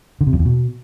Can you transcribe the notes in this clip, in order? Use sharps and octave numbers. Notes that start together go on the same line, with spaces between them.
D3
C3
F2
E2
B2